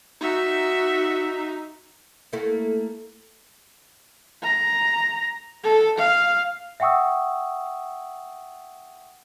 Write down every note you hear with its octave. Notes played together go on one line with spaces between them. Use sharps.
D#4 F#4 E5
A3 A#3 E4
A#5
A4
F5
E5 F#5 G5 C#6 D#6 E6